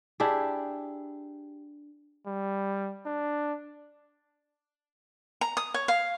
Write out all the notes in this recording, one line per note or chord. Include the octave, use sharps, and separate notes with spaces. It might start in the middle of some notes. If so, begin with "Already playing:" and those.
D4 E4 G4 G#4
G3
D4
A#5
D#6
C#5
F5